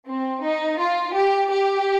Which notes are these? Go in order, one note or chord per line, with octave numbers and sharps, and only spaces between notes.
C4
D#4
F4
G4
G4